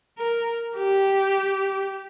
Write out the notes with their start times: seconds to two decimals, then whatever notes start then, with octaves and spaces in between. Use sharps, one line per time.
0.18 A#4
0.78 G4